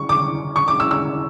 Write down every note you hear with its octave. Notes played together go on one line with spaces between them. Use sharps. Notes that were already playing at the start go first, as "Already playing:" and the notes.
Already playing: C#6
D6
C#6
D6
E6
E6